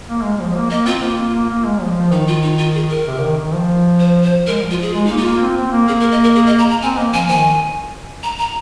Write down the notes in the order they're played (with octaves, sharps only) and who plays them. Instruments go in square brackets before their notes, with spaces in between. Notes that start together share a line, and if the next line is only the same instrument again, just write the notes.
[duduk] A#3
G#3
F3
A#3
[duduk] A#3 [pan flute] D#5
[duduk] C4 [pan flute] F4
[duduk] A#3 [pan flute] F4
[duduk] A#3
A#3
A#3
G#3
F3
F3
[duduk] D#3 [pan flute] D#4
[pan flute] F4
D#4
F4
G#4
A#4
[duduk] C3
D#3
D#3
F3
[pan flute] C5
C5
[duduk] G#3 [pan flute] A#4
[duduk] F3
[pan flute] F4
G#4
[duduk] G#3 [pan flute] F4
[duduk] A#3 [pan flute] D#4
[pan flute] F4
[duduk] A#3
A#3
C4
C4
A#3
[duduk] A#3 [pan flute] G#4
[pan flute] A#4
D#5
A#4
G#4
D#5
A#5
A#5
[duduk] C4 [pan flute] G#5
[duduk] A#3 [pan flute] D#5
[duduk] F3 [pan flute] G#5
[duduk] D#3 [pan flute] G#5
[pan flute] A#5
A#5